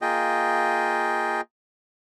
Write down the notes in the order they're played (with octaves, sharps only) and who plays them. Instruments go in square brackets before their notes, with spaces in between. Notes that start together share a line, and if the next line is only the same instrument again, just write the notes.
[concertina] A#3 F4 G#4 D#5 G5